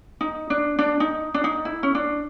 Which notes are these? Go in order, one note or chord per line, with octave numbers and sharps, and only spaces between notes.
D#4
D4
D4
D#4
D4
D#4
E4
C#4
D4